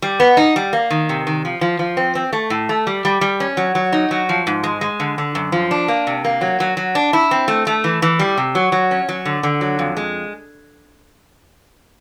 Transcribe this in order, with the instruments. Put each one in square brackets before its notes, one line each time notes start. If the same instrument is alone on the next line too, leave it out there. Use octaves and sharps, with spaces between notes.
[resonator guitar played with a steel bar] G3
B3
D#4
G3
A#3
D#3
C3
D#3
F3
F3
F3
C4
C4
A3
A2
A3
G3
G3
G3
C#4
F#3
F#3
D#4
F#3
F3
G#2
G#3
G#3
D3
D3
F#2
F3
D4
A#3
C3
A#3
F#3
F#3
F#3
D4
E4
C4
A3
A3
E3
E3
G3
C3
F#3
F#3
C#4
F#3
D3
D3
F#3
F2
G#3